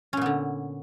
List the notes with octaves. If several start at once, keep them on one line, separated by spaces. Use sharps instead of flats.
A#2 D3 B3 C#4